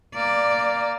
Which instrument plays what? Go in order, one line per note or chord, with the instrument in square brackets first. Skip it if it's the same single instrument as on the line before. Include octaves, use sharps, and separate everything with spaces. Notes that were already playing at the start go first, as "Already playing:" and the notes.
[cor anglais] A#3 [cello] D5